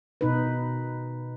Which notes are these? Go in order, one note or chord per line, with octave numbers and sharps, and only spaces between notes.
B2 D#4 B4